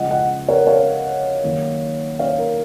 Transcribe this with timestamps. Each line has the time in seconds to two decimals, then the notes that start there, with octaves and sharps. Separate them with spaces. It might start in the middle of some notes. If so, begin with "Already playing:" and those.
Already playing: C#3 F3 G#3 D#5 F#5
0.10 D#5 F#5
0.49 A#4 C#5
0.67 C#5 F5
1.44 D#2 D#3 F#3 A#3 D#4
2.19 C#5 F5
2.39 A#4